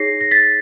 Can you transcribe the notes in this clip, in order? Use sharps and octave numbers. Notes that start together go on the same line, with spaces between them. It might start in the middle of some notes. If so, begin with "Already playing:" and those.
Already playing: D#4 G#4 C#5 A#6 C7
A#6
A6 B6